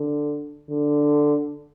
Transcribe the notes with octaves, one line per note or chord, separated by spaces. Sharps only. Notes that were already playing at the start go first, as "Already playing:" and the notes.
Already playing: D3
D3